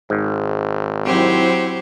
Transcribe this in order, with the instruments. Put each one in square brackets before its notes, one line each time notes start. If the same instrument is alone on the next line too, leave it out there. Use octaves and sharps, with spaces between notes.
[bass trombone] G#1 [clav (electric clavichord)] G#2
[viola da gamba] F#3 G4 C5 [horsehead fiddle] C4 E4